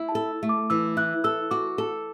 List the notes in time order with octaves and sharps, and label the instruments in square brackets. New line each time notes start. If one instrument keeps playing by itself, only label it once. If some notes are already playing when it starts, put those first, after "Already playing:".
Already playing: [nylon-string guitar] E4
[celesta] A5
[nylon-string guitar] A4
A3
[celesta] D6
[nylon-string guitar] E3 [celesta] E6
[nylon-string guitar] E4 [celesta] F#6
[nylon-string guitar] A4 [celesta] E6
[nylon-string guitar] F#4 [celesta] D6
[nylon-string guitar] A4